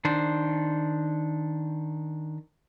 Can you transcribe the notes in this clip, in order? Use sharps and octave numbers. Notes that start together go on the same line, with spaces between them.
D#3 D4 C5